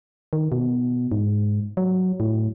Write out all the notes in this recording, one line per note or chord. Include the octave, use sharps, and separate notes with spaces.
D#3
B2
G#2
F#3
A2